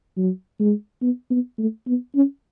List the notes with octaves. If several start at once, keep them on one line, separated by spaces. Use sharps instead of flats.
F#3
G#3
B3
B3
A3
B3
C#4